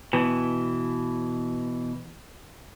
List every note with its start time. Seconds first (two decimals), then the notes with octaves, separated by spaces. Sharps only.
0.13 B2 E3